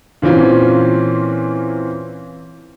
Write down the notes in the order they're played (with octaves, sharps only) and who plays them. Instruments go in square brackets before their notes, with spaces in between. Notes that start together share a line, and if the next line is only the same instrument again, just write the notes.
[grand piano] A#2 E3 C4 C#4 F4